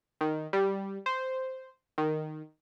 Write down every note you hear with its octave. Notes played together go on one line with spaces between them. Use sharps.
D#3
G3
C5
D#3